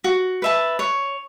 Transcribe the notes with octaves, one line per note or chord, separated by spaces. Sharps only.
F#4
B4 E5 A5
C#5